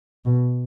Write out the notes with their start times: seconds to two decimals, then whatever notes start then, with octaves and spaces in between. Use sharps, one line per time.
0.25 B2